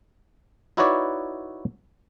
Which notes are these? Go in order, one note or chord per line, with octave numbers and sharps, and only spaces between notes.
D#4 E4 F#4 B4 C#5 D5